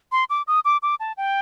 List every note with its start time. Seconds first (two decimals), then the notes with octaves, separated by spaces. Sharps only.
0.12 C6
0.30 D6
0.47 D#6
0.65 D6
0.83 D6
1.00 A5
1.17 G5